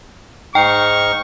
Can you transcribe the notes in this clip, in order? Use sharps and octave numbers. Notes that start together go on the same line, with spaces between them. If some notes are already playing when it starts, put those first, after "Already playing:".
G#2 D#4 G5 C#6 F6